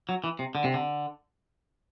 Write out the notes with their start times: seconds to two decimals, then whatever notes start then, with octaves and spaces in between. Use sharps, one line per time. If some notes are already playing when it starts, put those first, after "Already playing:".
0.09 F#3
0.24 E3
0.39 C3
0.55 D3
0.64 C3
0.74 D3